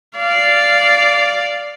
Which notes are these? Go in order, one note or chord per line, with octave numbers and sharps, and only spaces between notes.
D5 F5